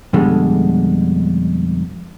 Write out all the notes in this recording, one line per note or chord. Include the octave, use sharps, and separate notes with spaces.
F2 B2 D3 G3 G#3